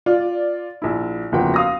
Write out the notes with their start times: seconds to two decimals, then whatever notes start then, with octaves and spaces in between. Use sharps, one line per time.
0.06 F4 D5
0.82 A#1 E4
1.32 F#1 E2 F3 F#4 G5
1.54 F5 D#6 A#6